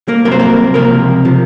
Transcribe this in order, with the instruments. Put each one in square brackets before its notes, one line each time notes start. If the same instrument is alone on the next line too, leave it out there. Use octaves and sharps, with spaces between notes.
[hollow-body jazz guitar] A#3 A#4
C2 C3 F#3 A#3 A#4
C5
A#3 A#4
C#2 C3 F3 A#3 A#4
C3 F3